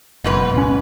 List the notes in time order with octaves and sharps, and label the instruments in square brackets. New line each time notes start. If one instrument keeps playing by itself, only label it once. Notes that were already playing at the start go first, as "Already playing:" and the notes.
[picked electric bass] F#1 [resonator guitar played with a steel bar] G#2 B2 B4
[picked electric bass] D1 C#4